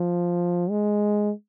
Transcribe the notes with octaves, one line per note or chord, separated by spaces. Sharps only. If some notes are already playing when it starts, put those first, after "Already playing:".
Already playing: F3
G#3